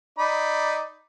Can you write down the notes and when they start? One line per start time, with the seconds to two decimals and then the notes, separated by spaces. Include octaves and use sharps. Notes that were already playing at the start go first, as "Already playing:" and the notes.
0.18 D#4 D5 B5